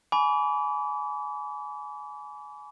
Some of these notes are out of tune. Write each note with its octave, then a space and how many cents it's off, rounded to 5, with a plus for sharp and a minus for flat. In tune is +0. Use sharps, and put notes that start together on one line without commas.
G#5 +20 B5 +0 D6 -40